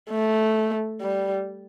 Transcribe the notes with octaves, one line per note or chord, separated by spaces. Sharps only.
A3
G3